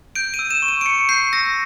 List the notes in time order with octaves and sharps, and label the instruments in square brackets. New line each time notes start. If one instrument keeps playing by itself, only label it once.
[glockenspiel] G6 D7
D#7
E6
E7
C#6
D#7
D7
C#6 C#7
G6 C7
E6 A#6